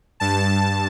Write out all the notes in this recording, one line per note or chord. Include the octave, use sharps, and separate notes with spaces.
G2 A5